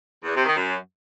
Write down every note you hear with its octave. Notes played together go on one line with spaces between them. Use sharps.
E2
C3
D#3
F#2